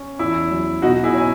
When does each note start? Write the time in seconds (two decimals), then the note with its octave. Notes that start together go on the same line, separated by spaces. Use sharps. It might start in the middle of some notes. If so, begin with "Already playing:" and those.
Already playing: C#4
0.19 E2 E4
0.51 F#3
0.82 B2 D#4 F#4
1.04 E4 G#4
1.14 C#4 G#5